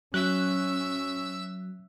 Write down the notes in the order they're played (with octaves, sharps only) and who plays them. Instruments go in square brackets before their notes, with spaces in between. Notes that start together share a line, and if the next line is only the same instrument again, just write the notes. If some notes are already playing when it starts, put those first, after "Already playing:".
[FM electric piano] F#3 [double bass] C#4 [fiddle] E5 E6 [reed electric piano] F#6